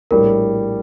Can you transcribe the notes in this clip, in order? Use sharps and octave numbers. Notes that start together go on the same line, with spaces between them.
A#1 A2 G3 A#4